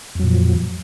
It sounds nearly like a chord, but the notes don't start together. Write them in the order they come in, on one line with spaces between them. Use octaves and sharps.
F2 F#3 A#2 F3